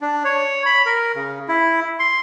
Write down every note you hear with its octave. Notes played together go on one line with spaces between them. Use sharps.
D4
C#5
B5
A#4
C#3
E4
C6